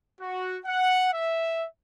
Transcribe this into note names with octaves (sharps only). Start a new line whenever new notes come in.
F#4
F#5
E5